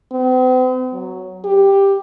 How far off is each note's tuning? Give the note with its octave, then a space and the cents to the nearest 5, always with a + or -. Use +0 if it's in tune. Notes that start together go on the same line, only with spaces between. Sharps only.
C4 -45
F#3 +5
G4 +5